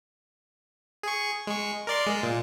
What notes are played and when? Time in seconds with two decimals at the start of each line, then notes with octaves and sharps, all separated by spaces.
1.03 G#4 C#6
1.47 G#3 C#6
1.87 A#4 D5 C6
2.06 G#3
2.23 A#2